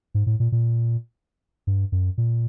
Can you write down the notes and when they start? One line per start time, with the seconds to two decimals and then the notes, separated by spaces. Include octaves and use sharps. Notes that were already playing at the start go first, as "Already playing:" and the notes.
0.14 G#2
0.27 A2
0.40 A#2
0.52 A#2
1.67 G2
1.92 F#2
2.18 A#2